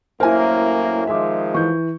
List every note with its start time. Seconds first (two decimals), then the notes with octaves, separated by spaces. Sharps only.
0.20 F#2 A2 A#3 E4 A#4 C5 G#5
1.07 D#3 F3 G#3 E5 D6
1.54 E3 C#6 G6